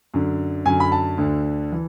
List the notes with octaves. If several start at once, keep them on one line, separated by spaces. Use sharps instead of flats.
F#2 D3
F#2 D3 G#5
B5
A5
D2 D3
E3